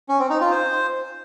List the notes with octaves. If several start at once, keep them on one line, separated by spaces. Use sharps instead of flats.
C#4
C4
D#4
F4
C5